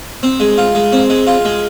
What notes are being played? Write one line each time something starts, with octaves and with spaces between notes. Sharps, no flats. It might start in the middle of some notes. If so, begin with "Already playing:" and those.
C4
G#3
F4
G#3
C4
G#3
F4
G#3